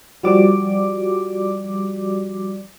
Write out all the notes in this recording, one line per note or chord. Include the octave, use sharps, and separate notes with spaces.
F3 G3 F#4 G4 D5 D6